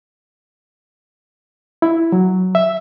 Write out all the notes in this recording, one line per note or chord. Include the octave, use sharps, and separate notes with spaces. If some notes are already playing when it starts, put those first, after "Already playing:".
E4
F#3
E5